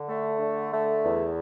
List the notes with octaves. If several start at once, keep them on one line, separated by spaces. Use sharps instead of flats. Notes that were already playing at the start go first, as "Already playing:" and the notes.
Already playing: D3
A3
D3
A3
E2